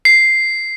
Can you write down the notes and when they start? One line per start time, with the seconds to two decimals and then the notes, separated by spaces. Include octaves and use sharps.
0.05 C7